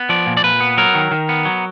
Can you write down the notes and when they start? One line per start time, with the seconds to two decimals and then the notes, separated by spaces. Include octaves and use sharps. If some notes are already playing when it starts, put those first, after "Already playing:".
Already playing: B3
0.09 F3 D5
0.27 A#2
0.37 D5
0.44 A#2 B4
0.61 B3
0.77 F#3 A#4
0.95 D#3
1.11 D#3
1.29 B3
1.45 F#3